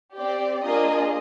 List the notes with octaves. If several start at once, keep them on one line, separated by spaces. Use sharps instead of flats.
C4 G4 D5
A#3 D4 F4 G#4 D#5